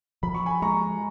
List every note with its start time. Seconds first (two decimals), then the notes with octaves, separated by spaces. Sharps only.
0.23 F3 B5
0.34 C#6
0.46 G#5 B5
0.62 G#3 A#5 C#6